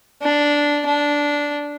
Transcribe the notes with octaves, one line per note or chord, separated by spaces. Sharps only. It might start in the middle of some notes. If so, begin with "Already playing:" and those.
D4
D4